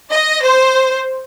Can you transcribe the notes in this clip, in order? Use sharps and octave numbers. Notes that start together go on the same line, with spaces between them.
D#5
C5